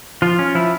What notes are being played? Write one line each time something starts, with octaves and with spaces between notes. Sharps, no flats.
F3 F4
C#4
F3 E4